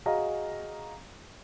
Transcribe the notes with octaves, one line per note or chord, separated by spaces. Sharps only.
F#4 G#4 D#5 F5 A#5